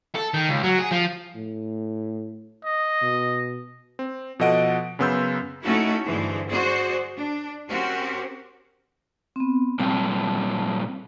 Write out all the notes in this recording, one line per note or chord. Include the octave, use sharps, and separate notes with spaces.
A4
D#3
C#2
F#3
G#4
F3
A2
D#5
B2
C4
B2 F3 A4 D#5 F#5 D7
F#2 C#3 B3 C6 E6 G6
A3 C#4 D#4 E4 F#4 A4
G2 D3 E3 G#4 C5
F#4 G#4 C5 D5
D4
C4 C#4 F#4 G4 A#4 C5
B3 C4
A#2 G3 C4 A5